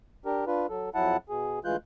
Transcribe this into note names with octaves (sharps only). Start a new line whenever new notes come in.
D4 G4 A#4
D4 F4 B4
F#3 A4
F2 F#3 E4 F#5 A5
B2 G#4
D2 E3 G#3 F4 F#6 G6